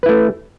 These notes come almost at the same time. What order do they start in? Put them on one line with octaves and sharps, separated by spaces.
B4 E4 A3